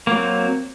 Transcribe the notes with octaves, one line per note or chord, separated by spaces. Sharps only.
F#3 A#3 C4